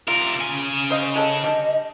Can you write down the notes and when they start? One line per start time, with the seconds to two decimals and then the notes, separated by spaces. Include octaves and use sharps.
0.08 C3 F4 A#4
0.41 C#3 G#5
0.90 C5 D#5 F5
1.15 G#3 A4 C#5 D#5
1.44 G3 D4